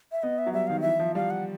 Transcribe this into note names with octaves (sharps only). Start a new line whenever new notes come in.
E5
B3 D#5
E5
F#3
G3 E5
D#3 F5
E3 E5
F3
G3 F5
F#5